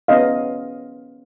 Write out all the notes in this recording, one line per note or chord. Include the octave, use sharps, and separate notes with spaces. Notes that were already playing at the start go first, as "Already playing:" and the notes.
B3 C#4 D#5 F5